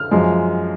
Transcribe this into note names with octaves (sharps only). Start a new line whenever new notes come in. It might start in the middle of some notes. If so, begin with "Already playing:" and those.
Already playing: F6
F#2 F3 G#3